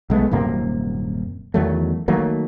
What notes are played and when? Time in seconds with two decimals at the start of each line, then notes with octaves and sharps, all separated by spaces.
0.10 B1 G#3 A3 B3
0.31 D#1 F#2 C3 A#3
1.54 E2 D#3 F#3 A3
2.08 D#3 F#3 A3 A#3